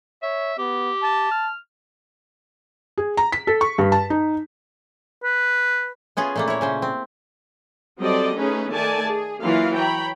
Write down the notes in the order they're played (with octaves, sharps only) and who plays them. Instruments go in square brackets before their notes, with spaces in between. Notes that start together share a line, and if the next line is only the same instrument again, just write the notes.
[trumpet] C#5 [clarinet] E5
[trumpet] B3 [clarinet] G4
[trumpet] A5
[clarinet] F6
[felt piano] G#4
A#5
B6
A4
C#6
G2
A5
D#4
[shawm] B4
[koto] B3 C#4 F4 G#4
A#2 A3 A#3
E4 C#5
C#3 C#4 C5
C4
[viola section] F#3 G3 C4 A4 D5 D#5
A3 C#4 D#4 G#4 B4
D#3 A3 A4 D5 G#5 A5
G#4
E3 F#3 A#3 F4 F5
C#5 G5 A#5 B5